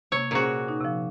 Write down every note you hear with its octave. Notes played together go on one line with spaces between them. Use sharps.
C3 A#3 C#5
A#2 C#4 F#4 G#4 C5
D#4
C3 F3